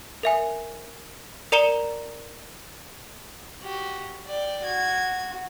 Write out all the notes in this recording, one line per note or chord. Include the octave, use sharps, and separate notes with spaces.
A#4 E5 G#5
A#4 D5 A#5 C#7 E7 G7
F#4 G4
D5 G5
F#4 G#6